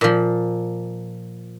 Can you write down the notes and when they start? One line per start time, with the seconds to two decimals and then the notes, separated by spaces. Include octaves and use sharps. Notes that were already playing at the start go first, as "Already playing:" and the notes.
0.01 A#2 F3